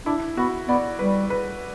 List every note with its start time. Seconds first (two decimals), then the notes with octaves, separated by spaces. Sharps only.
0.06 D4 E4
0.37 B3 F#4
0.68 B3 D5
0.99 G3 B4
1.30 B4